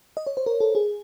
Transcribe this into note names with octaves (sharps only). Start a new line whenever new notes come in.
D#5
C#5
C5
A#4
A4
G#4